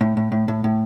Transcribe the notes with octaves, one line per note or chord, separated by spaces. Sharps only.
A2
A2
A2
A2
A2